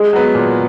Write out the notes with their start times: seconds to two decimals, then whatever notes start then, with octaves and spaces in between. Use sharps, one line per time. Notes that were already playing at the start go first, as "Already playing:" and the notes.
Already playing: G#3
0.13 F#3 B3
0.35 A#2